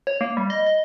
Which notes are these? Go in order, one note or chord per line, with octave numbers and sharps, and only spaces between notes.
C#5
A#3
G3
D#5
D#5